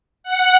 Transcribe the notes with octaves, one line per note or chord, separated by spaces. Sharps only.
F#5